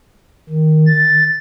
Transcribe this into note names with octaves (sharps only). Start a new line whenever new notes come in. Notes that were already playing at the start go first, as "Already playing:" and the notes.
D#3
A6